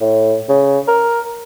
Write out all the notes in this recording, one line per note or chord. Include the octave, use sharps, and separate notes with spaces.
A2
C#3
A#4